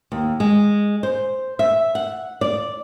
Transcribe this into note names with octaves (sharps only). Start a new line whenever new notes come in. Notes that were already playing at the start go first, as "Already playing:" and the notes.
D#2
G#3
C5
E5
F#5
D5